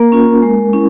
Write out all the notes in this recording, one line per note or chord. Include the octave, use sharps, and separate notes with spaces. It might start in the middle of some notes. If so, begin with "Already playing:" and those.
Already playing: A#3 A#4
C#4 F4
G#3
C#4 E4